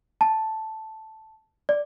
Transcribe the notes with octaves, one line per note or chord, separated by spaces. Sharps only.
A5
D5